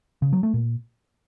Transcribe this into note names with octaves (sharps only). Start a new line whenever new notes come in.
C#3
F#3
A3
A#2